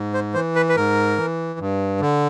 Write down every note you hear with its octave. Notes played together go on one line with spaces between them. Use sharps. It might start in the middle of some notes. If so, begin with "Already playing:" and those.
Already playing: G#2
C5
E3 C5
B4
B4
G#2 A#4
E3
G2
D3